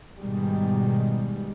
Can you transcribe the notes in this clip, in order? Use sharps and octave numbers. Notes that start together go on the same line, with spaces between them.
G#2 B2 D#3 G3 G#3